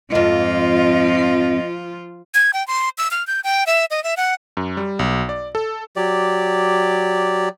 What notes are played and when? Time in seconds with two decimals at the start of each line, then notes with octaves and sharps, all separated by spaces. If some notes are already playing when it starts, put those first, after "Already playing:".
0.11 F2 G#2 F3 F4 D#5
2.34 G#6
2.54 G5
2.68 C6
2.98 E6
3.11 F6
3.27 G6
3.44 G5
3.67 E5
3.91 D#5
4.04 E5
4.17 F#5
4.57 F#2
4.77 G3
4.99 B1
5.29 D5
5.55 A4
5.96 F#3 G4 D5